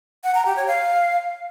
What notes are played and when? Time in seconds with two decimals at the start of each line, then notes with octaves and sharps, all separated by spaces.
0.24 F#5
0.35 A#5
0.45 G4
0.56 C#5
0.67 F5